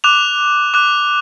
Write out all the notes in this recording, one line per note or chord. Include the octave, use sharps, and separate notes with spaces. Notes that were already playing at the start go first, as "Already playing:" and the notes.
D6 F#6 F7
D6 F#6